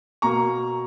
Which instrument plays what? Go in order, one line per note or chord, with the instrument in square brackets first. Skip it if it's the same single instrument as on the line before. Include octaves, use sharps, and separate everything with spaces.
[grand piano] B2 A#3 A#5 C#6